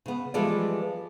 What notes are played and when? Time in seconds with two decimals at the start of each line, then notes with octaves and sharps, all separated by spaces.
0.06 C#3 B3
0.34 E3 F3 G3 G#3 A4 D5